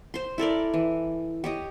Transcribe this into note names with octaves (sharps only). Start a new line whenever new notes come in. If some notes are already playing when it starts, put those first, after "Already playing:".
C5 C6
E4 A4 A#4 D5
E3
G4 C#5 D#5